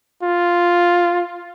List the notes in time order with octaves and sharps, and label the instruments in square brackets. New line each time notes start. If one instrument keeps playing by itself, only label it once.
[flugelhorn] F4